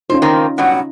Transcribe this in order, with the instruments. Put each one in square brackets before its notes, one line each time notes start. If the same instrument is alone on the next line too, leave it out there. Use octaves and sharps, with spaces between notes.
[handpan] C#4 D#4 F4 [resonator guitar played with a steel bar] C5
[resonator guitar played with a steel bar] D#3 A#3 C4
[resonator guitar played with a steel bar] G2 B2 F#3 [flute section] F#5